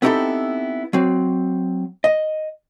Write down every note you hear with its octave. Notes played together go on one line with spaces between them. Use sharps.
B3 C4 D#4 E4 G4 A4
F#3 C4
D#5